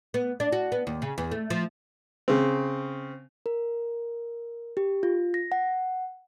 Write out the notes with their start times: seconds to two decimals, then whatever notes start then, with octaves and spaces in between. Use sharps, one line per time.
0.14 B3
0.40 D4
0.52 F#4
0.72 B3
0.87 D#2
1.02 C#3
1.18 E2
1.31 A3
1.50 F3
2.28 C#3 C4
3.46 A#4
4.77 G4
5.03 F4
5.34 A#6
5.52 F#5